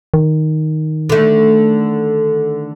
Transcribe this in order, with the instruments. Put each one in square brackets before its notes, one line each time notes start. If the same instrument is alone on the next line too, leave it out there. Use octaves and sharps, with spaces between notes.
[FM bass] D#3
[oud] D3 A3